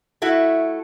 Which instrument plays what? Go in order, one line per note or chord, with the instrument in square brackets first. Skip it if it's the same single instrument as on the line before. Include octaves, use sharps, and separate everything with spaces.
[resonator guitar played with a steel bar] A3 E4 F#4